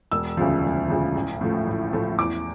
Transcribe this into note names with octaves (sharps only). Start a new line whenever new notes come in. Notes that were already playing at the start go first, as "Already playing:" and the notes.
E1 E6
D2 C#3 F3
E1
D2 C#3 F3
A1
A2 F3 A3
A1
A2 F3 A3
E2 D6